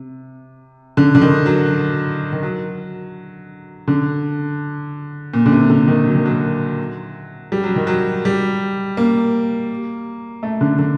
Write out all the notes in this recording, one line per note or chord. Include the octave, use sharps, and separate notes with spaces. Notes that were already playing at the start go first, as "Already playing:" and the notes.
Already playing: C3
D3
D3
D#3
F#3
D#3
F#3
D3
A#2
D3
C3
D3
D#3
F#3
D#3
F#3
G3
F#3
D#3
F#3
G3
A#3
A3
D3
D3